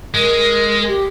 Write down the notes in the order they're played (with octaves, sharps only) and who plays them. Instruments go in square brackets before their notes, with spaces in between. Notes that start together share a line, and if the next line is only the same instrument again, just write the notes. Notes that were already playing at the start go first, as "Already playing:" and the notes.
[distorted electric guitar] G#3 [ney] A#4
[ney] G4